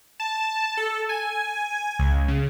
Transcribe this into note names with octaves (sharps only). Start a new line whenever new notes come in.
A5
A4
G#5
C#2
C#3